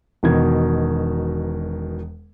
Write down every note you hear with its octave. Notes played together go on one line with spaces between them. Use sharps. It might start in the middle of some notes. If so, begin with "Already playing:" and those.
E1 B2 D#3 G#6